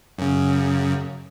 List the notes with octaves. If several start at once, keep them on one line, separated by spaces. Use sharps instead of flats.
F#2 C#3